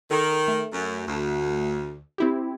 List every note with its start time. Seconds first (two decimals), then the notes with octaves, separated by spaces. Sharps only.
0.11 D#3 A4
0.48 A3
0.72 F#2
1.06 D2
2.18 C4 E4 G4